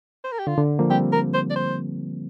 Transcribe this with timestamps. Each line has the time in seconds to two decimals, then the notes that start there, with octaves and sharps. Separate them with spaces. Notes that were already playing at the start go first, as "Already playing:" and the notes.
0.24 C5
0.32 A#4
0.39 G4
0.47 D3 F4
0.58 D3
0.79 F3 A#3
0.90 G3 C4 G4
1.13 A#4
1.33 C5
1.50 D5
1.56 C5